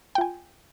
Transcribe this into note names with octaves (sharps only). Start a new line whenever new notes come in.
F4 G5 G#5